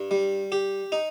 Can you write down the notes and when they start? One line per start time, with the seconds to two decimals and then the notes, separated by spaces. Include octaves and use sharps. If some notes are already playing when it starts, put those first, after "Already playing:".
Already playing: G2
0.11 G3
0.52 G4
0.92 D#4